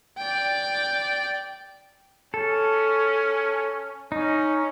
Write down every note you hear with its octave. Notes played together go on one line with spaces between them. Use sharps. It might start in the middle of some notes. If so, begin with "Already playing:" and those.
D5 G5
C#4 A4
C#4 D#4